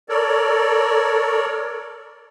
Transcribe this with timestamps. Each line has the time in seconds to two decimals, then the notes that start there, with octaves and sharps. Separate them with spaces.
0.09 A4 A#4 C#5 D5